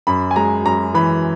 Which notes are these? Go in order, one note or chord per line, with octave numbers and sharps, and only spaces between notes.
F#2 B5
G#5
G#3 A#5
F#2 A#5
E3 B5